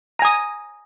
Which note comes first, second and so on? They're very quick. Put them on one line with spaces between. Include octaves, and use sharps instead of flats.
A#5 G#5 D#6